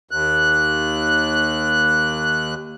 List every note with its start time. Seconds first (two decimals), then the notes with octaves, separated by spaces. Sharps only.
0.11 D#2 F#6